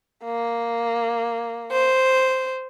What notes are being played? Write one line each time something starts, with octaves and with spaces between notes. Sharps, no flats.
A#3
C5